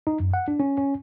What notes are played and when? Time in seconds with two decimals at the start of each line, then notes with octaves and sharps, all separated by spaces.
0.07 D#4
0.20 F#2
0.34 F#5
0.48 D4
0.60 C#4
0.78 C#4